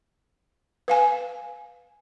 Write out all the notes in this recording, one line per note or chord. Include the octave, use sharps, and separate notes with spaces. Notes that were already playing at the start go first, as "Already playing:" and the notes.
B4 F5 G#5